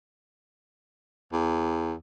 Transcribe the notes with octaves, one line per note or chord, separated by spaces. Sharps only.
E2